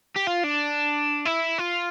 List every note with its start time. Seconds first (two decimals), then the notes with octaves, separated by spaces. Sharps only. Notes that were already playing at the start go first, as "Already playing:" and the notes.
0.16 G4
0.27 F4
0.43 D4
1.26 E4
1.59 F4